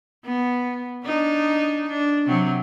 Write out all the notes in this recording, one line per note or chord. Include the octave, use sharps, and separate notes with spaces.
B3
D4 D#4
D4
C3 F#3 C4